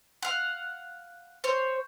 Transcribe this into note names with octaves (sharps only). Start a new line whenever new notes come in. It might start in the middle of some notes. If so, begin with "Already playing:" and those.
F5 F#5
C5 C#5